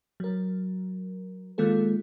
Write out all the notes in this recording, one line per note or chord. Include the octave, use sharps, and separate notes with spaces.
F#3 A#4
D#3 G#3 A#3 F4 A4